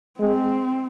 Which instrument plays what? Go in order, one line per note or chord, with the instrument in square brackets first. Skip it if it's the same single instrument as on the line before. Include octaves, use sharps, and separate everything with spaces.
[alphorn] G#3 [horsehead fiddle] C4